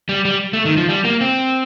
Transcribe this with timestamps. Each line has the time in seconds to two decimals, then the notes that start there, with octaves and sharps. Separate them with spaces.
0.09 G3
0.25 G3
0.53 A3
0.65 D#3
0.77 F3
0.89 G3
1.05 A#3
1.21 C4